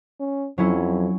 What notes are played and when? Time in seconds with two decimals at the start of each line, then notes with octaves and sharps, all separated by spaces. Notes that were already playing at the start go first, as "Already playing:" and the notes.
0.20 C#4
0.58 F2 F#3 C#4 E4